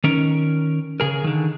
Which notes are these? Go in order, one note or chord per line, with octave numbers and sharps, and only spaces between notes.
D#3 C#4 A#4
C#3 G#4 A#4
D3 D#3